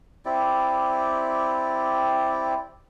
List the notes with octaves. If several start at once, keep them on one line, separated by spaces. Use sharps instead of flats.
C4 E4 G4 D5